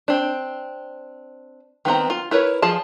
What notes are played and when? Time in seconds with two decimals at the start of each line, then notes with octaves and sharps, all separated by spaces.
0.08 C4 D4
1.85 D#3 B3 C4 A#5
2.10 F4
2.31 E4 A#4 B4 C#5
2.62 F3 F4 G#4 A5